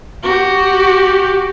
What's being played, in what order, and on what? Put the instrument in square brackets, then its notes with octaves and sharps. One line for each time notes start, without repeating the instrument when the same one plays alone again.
[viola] F#4 G4